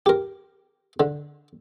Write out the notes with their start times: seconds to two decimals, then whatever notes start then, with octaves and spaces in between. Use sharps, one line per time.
0.06 G4 A#4
1.00 D3